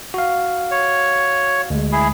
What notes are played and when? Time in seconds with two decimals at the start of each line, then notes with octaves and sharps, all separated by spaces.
0.14 F#4 F5
0.71 C#5
1.70 D2 G#3
1.92 E4 G#4